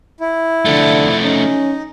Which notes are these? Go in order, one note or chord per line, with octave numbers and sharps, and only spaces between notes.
E4
D3 F3 A3
C#4 D#4